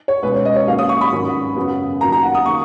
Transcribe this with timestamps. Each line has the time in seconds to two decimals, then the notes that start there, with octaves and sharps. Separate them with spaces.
0.08 C#5
0.23 C#2 B2 G#3 C#4 B4
0.34 C#5
0.45 D#5
0.56 C#5
0.67 D#2 D#3 F#3 A#3 C#4 F5
0.79 D#6
0.89 C#6
1.01 B5
1.12 G#1 G#2 D#3 F#3 C#4
1.56 F#2 C#3 F#3 B3
2.01 D#2 D#3 F#3 A#5
2.12 A#5
2.23 F#5
2.35 D#6
2.45 D#3 A#3 C#6